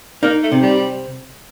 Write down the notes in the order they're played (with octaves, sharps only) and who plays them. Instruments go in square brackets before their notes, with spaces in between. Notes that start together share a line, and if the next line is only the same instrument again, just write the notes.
[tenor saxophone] A#3 [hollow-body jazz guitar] D#4
[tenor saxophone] A3
[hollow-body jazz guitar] C3
[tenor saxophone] G3